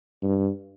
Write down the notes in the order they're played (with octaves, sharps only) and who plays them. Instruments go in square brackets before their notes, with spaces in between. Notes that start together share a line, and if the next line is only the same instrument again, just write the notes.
[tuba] G2